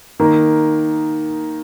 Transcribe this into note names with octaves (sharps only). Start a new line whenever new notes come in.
D#3 A#3 D#4